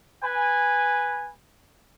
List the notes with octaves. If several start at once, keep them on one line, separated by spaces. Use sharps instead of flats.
B4 G#5